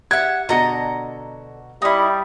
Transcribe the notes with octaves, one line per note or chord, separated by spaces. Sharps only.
G4 E5 F#5 G#6
B2 D3 F#4 D#5 A#5 C#7
G3 D#4 E4